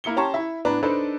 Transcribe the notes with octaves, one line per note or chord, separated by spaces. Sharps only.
A#3 E4 C#7 G7
C#4 G4 A5 A#5 C6 C#6
E4 E5
A2 B3 D4 B4 A#5
D4 D#4 A4 B4 C5 D5